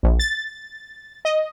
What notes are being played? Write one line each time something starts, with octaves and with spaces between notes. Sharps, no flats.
A#1
A6
D#5